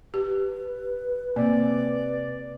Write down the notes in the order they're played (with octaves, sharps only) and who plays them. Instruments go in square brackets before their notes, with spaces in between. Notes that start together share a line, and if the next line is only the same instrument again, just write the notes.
[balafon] G4 [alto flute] B4
[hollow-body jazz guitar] C3 [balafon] A#3 [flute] D5